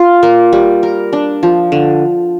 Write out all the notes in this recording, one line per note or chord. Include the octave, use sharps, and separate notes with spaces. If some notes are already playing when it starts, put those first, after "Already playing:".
Already playing: F4
A#3
G3
A#4
D4
F3
D3